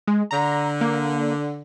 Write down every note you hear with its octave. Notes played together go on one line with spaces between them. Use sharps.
G#3
D3 A#5
A#3